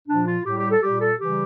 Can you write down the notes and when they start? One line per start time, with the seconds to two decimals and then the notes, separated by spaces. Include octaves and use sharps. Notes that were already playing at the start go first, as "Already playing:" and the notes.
0.08 A#2 F3 D4
0.26 F4
0.45 A2 G4
0.49 G3
0.58 G4
0.70 A4
0.82 A#2 G3 G4
1.01 A4
1.19 C#3 E3 G3 G4